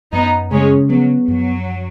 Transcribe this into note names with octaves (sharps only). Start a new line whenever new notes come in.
F#2 B3 D#4
C#3 G#3 C#4
F#3 B3
F#2 F#3